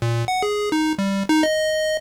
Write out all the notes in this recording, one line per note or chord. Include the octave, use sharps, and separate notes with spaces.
A#2
F#5
G#4
D#4
G3
D#4
D#5